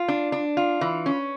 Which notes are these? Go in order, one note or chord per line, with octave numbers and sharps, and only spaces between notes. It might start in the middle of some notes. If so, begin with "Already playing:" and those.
Already playing: F4
D4
D4
F4
E3
C#4